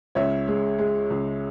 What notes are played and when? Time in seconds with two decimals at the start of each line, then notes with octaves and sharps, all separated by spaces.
0.15 C#2 C#5 E5
0.48 G#3
0.79 G#3
1.10 C#2